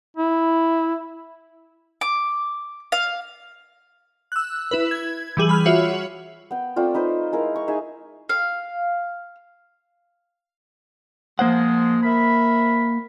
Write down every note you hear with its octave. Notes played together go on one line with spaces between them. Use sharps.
E4
D6
F5
E6 F#6
E4 B4
G#6
E3 G3 G#4 F#7
B5 F6
F4 F#4 C#5 E5
B3 G5
A3 C4 F4 D5
D#4 B4 C5
G#3 E4 A#4 F5
C#6
D#4 G#4 E5 G#5
F5
F3 G#3 A#3 C5 F#5
A#4 E5 B5